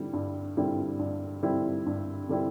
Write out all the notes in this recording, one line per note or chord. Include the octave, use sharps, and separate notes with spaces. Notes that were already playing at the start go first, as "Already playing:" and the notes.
Already playing: D3 G3 C4 E4
G2
D3 G3 C4 E4
G2
D3 G3 C4 E4
G2
D3 G3 C4 E4